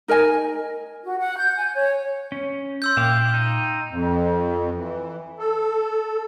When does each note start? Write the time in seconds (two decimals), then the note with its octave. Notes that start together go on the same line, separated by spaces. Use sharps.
0.08 D#4 A#4 D#5 G#5
1.04 F#4
1.19 F#5
1.37 G6
1.58 G#5
1.75 C#5
2.32 C#4
2.82 C6 E6 G6
2.97 A#2 E5 F5 G5 D6
3.34 D#4
3.91 F2
4.77 E3
5.38 A4